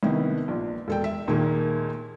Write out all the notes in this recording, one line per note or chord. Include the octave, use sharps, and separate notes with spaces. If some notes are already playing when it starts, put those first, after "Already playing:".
C2 C3 D#3 B3
A#1
E1 A4 G5
E5
D#2 A#2 D#3 G#3 A#3